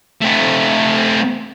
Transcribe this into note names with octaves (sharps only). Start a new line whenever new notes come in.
A3 C4